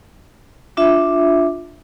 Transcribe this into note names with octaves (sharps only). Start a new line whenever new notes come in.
D4 F4 E5